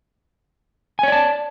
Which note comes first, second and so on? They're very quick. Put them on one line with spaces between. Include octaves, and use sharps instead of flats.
G#5 C#5 D5 A5